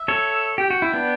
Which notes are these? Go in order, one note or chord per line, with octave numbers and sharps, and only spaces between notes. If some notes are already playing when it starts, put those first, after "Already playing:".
Already playing: E5
A4 C#5
G4 G5
F#4
E4
B3 D4